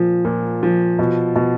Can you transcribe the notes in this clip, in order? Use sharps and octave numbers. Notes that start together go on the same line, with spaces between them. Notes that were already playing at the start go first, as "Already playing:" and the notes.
Already playing: A#2 F3
A#2
F3
B2
B2